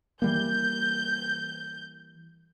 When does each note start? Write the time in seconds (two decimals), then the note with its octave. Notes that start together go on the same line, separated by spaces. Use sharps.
0.22 E3 G3 A#3 G6